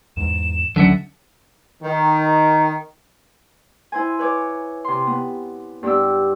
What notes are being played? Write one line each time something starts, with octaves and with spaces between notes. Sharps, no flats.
E2 G#2 E7
D2 D3 D#3 F#3 C#4 E5 F#5 A5
D#3
E4 C5 G#5
B4 C#5 D6
C3 C6
B3
G2 B3 G4 E6